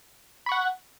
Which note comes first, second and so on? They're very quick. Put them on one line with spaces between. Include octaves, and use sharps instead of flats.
B5 C#6 F#5